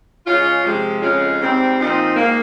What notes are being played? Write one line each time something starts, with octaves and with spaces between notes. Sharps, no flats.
C#3 G#3 C#4 F4
C3 F3 G#3
F2 C#3 G#3 C#4 F4
G#2 G3 C4
A#2 F3 C4 D#4
G#2 D#3 A#3